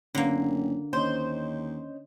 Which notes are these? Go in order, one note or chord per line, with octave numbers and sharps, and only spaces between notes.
F#1 D3 A#3 B3 C#4
D#2 C#4 C5 C#5 D#5